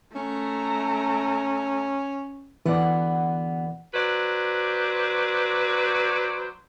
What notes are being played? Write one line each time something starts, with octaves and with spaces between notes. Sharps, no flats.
A3 C#4 A#5
D2 E3 B3 D5 F#5
F#3 B4 C5 D5